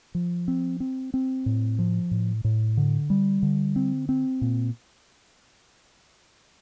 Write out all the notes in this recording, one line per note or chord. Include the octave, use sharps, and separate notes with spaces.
F3
C4
C4
C4
A2
F3
A2
A2
D3
G3
D3
C4
C4
A#2